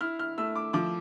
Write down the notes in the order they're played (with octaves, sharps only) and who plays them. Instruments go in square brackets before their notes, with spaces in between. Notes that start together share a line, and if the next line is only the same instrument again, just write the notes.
[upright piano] E4 F6
F6
A3 E6
D6
F3 D6